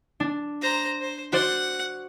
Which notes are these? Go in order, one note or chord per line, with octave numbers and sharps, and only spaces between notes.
D4
C5 A#5
C5
F#4 C5 D5 F#5